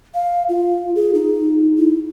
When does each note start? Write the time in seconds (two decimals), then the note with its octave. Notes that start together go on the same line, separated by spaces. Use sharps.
0.14 F5
0.49 F4
0.96 G#4
1.14 D#4
1.78 E4